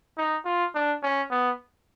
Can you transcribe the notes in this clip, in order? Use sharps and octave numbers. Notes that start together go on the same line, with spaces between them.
D#4
F4
D4
C#4
B3